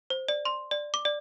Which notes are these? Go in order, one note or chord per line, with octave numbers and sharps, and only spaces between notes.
C5
D5
C6
D5
D6
D5